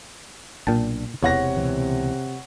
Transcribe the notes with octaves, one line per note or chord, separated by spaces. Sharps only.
B1 A#2 D4 G5 A5
E1 E2 C3 C#5 F#5 A#6
C#2 B2 E3